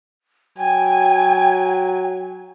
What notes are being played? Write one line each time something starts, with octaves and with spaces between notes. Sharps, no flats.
F#3 G5 G#5